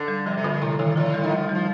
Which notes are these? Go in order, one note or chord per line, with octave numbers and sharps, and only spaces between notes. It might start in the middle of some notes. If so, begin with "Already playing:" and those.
Already playing: D3
G3
C3 F3
C3
A#2 D3
A2 C3
A2 D#3
A2 F3
G3
D#3
F3 A3
G3
F3